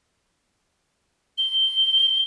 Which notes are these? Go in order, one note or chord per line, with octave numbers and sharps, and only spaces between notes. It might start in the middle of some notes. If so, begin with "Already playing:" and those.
G7